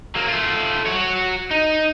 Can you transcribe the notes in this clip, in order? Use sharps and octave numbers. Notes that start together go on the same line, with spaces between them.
F#3 A#3
A3 F4
F#4 C#5
D#4